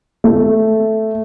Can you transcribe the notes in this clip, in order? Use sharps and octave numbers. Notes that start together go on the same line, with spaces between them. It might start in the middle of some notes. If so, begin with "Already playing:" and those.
A3